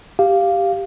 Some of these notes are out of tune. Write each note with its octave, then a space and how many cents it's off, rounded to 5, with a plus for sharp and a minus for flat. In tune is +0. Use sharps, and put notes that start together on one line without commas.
G4 +0 F5 -5